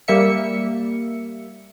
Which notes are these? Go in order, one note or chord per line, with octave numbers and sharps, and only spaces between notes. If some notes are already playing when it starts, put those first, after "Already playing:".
G3 A#3 E5 C#7